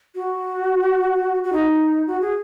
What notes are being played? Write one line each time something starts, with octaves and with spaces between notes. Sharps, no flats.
F#4
F#4
D#4
F#4
G#4